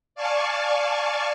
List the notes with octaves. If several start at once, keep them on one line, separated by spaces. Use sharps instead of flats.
D5 F5 G#5 A5 C#6